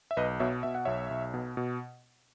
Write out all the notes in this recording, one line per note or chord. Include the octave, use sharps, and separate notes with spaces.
E5
B1 B4 D#5
B2 C#5 E5
B2 E5
F#5
B1 C#5 E5
B1
B2
B2